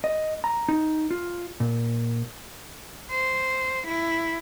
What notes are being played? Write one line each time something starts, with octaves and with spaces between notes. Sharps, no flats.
D#5
A#5
D#4
F4
A#2
C5
E4